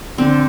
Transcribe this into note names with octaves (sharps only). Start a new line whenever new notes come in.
D3 C4